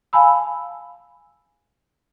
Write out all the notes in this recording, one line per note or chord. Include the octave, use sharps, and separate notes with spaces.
F5 G#5 A5 B5 E6